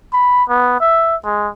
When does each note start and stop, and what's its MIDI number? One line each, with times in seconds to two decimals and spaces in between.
0.13 0.44 83
0.49 0.78 59
0.80 1.16 76
1.24 1.48 56